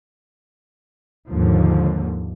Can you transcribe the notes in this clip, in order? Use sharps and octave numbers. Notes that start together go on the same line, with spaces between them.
D#2 G#2 D3 F3